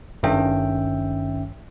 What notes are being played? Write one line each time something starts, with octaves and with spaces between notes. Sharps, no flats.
G#1 G2 D#3 C#4 E5 G5